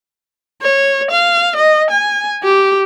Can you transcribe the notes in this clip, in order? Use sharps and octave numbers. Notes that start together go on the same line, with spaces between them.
C#5
F5
D#5
G#5
G4